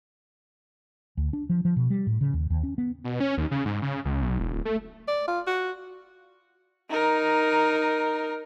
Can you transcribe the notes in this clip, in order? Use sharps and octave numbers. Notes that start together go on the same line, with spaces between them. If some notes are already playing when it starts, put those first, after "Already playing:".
D2
D4
F3
F3
B2
G3
A2
C#3
D#2
D#2
C#4
B3
B2
C#4
D#2
C#3
G#2
C#3
C#2
B1
E1
D1
A3
D5
F4
F#4
D#4 A#4